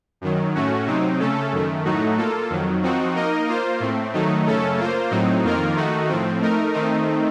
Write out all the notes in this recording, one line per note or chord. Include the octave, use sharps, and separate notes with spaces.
F#2 D#3 F#3
A2 A3 C#4 F#4
C3 F#3 C4 D#4
C#3 A3 C#4 A4
F#2 D#3 A3
A2 F#3 A3 D#4 F#4
A#3 F4 A4
F2 D#3 F#3
F3 C4 D#4 F#4
A#3 D#4 A#4 D#5
A#3 F4 C5
A2 A3 C4
D#3 F#3 A3 D#4
F#2 C#3 A3 C#4 A4
A#3 F4 C5
A2 F#3 C4 D#4
F2 D#3 A#3 F4 A#4
D#3 A3 D#4 F#4
A2 F3 C4
A3 D#4 A#4
D#3 A3 C4 D#4